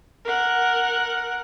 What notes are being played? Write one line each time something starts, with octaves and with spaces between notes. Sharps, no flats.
A#4 F#5